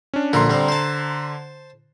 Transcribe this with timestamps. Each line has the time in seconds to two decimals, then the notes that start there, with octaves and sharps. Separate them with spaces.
0.14 C#4 D4
0.33 A#1 D3 A#4 A#5 C6
0.50 G3 C4
0.68 C5 A5